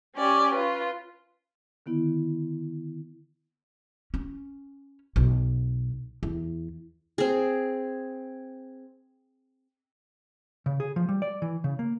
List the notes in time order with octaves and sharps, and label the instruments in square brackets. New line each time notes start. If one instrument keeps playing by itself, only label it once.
[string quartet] C#4 G4 D5
F4 B4
[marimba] D3 D#3 B3 E4
[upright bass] C#4
B1
E2
[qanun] C4 G#4
[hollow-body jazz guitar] C#3
G#4
F3
G3
D5
E3
C#3
A#3